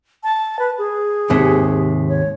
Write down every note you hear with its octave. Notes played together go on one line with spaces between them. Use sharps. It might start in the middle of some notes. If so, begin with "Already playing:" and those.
A5
B4
G#4
D#2 G#2 C3
C#5